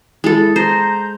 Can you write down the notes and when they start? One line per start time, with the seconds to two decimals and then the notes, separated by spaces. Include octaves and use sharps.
0.24 G#3 E4 A4
0.56 C5 A#5 G6